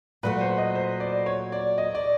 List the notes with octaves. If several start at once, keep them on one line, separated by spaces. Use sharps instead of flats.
A#2 F#3 A3 B4
C5
D#5
C5
D5
C#5
D5
D#5
D5